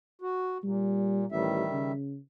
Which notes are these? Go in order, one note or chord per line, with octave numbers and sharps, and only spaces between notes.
F#4
A#2 G3
A1 D#3 G3 E5
C#3